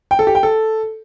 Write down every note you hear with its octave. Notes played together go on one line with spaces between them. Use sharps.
G5
A4
G4
G5
A4